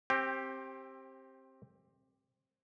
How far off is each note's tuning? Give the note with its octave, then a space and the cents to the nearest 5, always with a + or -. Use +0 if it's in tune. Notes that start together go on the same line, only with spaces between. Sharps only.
C4 +20 G4 +0